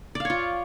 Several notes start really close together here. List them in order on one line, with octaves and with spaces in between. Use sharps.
D5 F5 C#5 F4